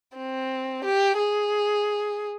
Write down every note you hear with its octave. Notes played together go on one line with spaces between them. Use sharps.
C4
G4
G#4